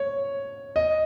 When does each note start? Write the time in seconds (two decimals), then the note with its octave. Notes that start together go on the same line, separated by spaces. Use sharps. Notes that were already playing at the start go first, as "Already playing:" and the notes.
Already playing: C#5
0.76 D#5